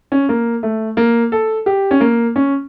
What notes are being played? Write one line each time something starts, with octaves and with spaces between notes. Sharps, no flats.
C#4
A#3
A3
A#3
A4
G4
C#4
A#3
C#4